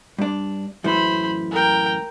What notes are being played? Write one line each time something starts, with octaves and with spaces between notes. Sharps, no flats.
G2 D4
F#2 A2 E3 C5 B5
A#4 G5